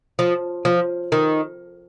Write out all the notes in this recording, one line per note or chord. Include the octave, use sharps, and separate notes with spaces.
F3
F3
D#3